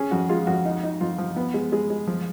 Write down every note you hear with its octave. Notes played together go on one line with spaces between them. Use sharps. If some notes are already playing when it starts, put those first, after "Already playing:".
Already playing: C#4 G#4
F2 F#4
G#3 F4
F2 F#4
D#4
D#4
F2 F4
F3
B3
G#3
G#3 G#4
G#3
F3